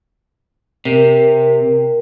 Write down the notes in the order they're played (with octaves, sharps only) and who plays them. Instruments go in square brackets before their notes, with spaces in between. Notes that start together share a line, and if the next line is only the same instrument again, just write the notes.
[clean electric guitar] C3 [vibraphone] A#4